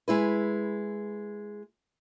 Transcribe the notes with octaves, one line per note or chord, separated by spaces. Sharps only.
G#3 E4 B4